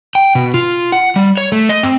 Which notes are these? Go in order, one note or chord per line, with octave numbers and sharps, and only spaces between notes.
G5
B2
F4
F#5
G3
C#5
A3
D#5
C4